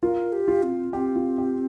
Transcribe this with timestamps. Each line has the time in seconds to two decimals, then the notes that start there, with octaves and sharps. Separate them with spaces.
0.02 F4 A#4
0.32 G4
0.48 F4
0.63 C4
0.93 C4 G4
1.16 F4
1.38 G4